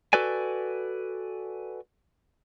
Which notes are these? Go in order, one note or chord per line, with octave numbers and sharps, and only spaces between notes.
F#4 A4 B4 D5 G#5